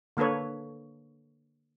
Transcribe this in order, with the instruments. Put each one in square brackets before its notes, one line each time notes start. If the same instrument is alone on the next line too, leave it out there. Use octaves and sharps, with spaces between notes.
[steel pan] D3 A#3 A4 B4 C#5